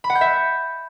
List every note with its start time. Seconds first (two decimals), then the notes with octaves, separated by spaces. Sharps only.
0.04 B5
0.10 F#5
0.15 G6
0.21 E5